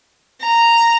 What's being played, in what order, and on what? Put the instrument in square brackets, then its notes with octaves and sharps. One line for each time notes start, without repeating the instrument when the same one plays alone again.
[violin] A#5